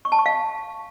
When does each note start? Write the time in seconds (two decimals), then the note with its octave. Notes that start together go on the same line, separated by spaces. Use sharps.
0.05 C#6
0.12 A5
0.19 C#6
0.26 F5